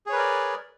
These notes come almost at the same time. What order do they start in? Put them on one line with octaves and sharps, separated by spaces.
G#4 C#5 B4 A#4 D5